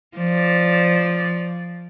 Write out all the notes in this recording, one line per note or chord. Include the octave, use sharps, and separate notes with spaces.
F3 D5